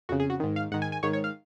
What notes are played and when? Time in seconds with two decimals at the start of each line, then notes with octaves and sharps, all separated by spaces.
0.09 F2 C#3 F#4
0.20 G#4
0.30 F#4
0.40 G#2 D#3
0.56 F5
0.72 G#2 D#3 F#5
0.82 G#5
0.92 G#5
1.03 G#2 D#3 C#5
1.13 C#5
1.24 F5